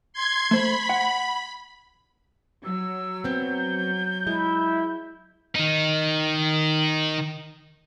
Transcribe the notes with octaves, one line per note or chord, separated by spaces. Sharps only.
C6 G#6
A3 C5 B5
F#5
F#3 E6
B3 C4 G6
G#3 E4
D#3 D#4